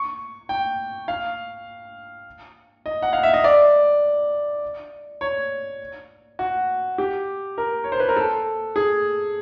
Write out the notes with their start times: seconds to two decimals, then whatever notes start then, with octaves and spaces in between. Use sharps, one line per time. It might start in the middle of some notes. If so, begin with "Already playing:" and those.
Already playing: C#6
0.49 G5
1.08 F5
2.86 D#5
3.02 F#5
3.13 F5
3.23 E5
3.34 D#5
3.44 D5
5.21 C#5
6.39 F#4
6.98 G4
7.58 A#4
7.84 C#5
7.92 C5
8.00 B4
8.08 A#4
8.16 A4
8.76 G#4